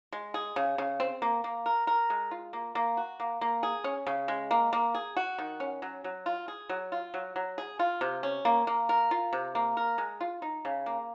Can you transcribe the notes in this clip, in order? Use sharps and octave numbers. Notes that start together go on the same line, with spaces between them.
G#3
G#4
C#3
C#3
C4
A#3
A#3
A#4
A#4
G#3
F4
A#3
A#3
F#4
A#3
A#3
G#4
C#4
C#3
G#3
A#3
A#3
G#4
F#4
D#3
C#4
F#3
F#3
F4
G#4
F#3
F4
F#3
F#3
G#4
F4
C3
C#4
A#3
A#3
A#4
F4
C3
A#3
A#4
G#3
F4
D#4
C#3
A#3